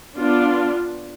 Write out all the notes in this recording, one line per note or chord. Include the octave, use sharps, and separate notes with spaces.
B3 D4 F4